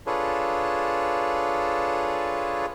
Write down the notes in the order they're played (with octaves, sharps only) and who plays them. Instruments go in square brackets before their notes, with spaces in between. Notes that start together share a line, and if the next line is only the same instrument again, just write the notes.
[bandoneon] D4 F4 G#4 A4 B4 C#5